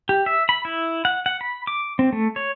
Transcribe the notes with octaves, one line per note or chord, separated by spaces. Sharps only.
G4
E5
B5
E4
F#5
F#5
B5
D6
C4
A3
C#5